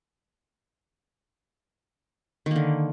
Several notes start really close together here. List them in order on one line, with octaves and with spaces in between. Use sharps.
D#3 A#3 D3